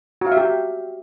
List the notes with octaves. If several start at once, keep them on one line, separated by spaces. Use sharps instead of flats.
F#4
F5
E5
G4